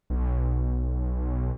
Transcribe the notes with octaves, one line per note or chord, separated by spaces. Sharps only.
B1